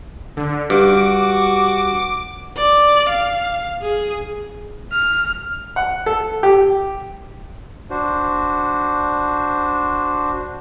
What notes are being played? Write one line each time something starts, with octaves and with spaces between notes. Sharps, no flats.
D3
G2 F#4 D6
D5
F5
G#4
F6
F#5
A4
G4
D4 F#4 C5